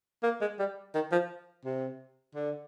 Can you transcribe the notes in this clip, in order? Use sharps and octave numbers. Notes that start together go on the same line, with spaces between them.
A#3
G#3
G3
D#3
F3
C3
D3